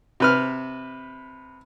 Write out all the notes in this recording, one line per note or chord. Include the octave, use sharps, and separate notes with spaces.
C3 B4 F6